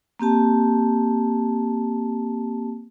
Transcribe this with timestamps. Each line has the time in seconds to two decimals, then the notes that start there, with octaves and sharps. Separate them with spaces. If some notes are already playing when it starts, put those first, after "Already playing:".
0.19 A#3 C4 G4 A5